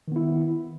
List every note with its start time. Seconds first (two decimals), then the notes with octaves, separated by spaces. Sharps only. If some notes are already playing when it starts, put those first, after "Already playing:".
0.08 D#3
0.12 B3
0.16 E4